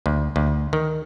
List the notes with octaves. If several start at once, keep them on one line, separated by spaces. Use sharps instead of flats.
D2
D2
D#3